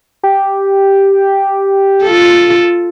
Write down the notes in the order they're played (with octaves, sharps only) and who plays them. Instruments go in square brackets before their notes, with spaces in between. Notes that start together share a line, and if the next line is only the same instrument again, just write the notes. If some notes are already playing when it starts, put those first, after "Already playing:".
[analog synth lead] G4
[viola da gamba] F4 A4